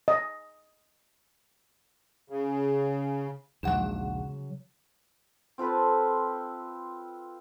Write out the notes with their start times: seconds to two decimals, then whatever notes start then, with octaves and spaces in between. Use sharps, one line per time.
0.08 D#5
2.30 C#3
3.63 A#1 D#2 C#3 F#3 G#3 F#5 E7
5.58 C4 F4 A4 B4